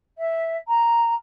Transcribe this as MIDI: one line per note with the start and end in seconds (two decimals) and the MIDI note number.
0.18 0.56 76
0.68 1.14 82